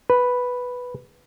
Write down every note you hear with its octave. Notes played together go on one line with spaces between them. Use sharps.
B4